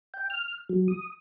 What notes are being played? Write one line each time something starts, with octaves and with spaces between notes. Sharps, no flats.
G5
F6
F#3
D#6